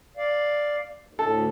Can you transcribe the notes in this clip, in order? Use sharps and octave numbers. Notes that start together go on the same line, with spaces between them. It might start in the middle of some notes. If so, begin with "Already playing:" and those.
D5 F5
D#2
D2 A2 A4